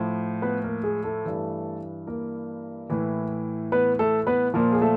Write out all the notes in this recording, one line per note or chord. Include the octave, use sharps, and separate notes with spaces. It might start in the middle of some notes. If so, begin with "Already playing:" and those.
Already playing: A2 F3
B3 B4
A#3 A#4
G#3 G#4
A3 A4
G2 E3
A#3 A#4
A2 E3
B3 B4
A3 A4
B3 B4
A#2 F3 A#3 A#4
G#4
A3 A4